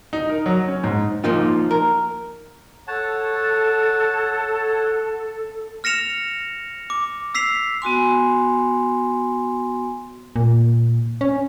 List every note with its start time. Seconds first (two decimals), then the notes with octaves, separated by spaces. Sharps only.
0.13 D#4
0.29 A#4
0.46 F#3
0.68 C#4
0.84 G#2
1.24 F3 A#3 D#4 F4
1.71 A#4
2.87 A4 C#5 F#5 A5
5.84 F6 A#6 C#7 E7 F7
6.90 D6
7.35 E6 B6 C7 F7
7.82 B3 F#4 G#5 C6
10.36 A#2
11.21 C#4